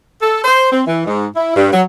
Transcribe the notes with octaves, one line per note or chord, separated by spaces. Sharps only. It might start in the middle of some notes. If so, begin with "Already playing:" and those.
A4
C5
C4
E3
G#2
E4
G2
F#3